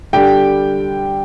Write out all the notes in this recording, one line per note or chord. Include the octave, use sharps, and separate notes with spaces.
D3 G3 D4 G4 G5